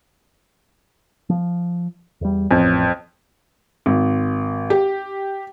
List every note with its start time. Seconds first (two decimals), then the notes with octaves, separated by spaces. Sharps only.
1.29 F3
2.21 E2 G3
2.51 A1 F2
3.86 G#1
4.70 G4